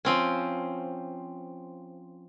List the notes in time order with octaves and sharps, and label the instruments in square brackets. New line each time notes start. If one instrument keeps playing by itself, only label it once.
[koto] F3 C4 C#4